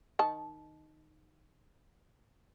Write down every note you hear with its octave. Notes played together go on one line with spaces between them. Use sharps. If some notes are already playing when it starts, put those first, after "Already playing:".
D#3 A5